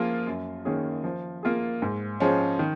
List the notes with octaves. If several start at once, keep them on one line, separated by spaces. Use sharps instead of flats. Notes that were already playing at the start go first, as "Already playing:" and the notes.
Already playing: F3 A#3 F4 G#4
F#2
D#3 A#3 C#4 G#4
F3
A#3 F4 G#4
G#2
F3 G#3 C#4
D#3